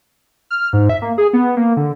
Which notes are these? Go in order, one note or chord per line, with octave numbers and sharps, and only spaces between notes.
F6
G#2
E5
A#3
G#4
B3
A#3
D3